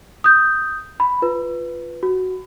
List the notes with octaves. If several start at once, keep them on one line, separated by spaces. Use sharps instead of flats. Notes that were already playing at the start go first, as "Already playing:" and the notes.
D#6 G6
B5
F4 B4
F#4